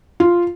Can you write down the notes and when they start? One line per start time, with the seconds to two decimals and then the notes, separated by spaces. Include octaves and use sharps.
0.20 F4